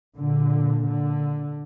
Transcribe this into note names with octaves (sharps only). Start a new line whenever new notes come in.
A#2 D3
D3